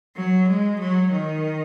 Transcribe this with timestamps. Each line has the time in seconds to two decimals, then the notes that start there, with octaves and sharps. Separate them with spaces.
0.16 F#3
0.48 G#3
0.80 F#3
1.12 D#3